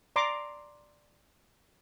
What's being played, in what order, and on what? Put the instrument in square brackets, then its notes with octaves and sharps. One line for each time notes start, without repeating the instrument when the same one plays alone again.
[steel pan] D5 A#5 C6 D6